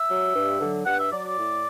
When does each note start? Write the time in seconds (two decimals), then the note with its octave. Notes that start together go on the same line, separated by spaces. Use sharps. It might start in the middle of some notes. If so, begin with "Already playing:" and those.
Already playing: E5
0.09 F#3
0.34 G2
0.60 D3 F#3
0.86 G2 F#5
0.99 E5
1.11 F#3 D5
1.25 D5
1.38 A2